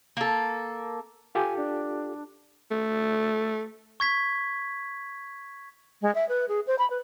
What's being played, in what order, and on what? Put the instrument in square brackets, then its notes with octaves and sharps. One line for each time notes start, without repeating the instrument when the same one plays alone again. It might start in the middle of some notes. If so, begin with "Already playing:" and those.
[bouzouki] A#3 A4
[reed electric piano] F4 G4 A4 [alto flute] G#5
[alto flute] D4
[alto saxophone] A3
[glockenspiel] C#6 G#6 B6
[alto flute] G#3
E5
B4
G#4
C5
B5
B4